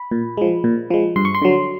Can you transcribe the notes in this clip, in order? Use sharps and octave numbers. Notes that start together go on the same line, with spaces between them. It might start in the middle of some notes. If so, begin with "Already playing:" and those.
Already playing: B5
A#2
F3 G#3
A#2
F3 G#3
G2 C6
C#6
C6
D3 F#3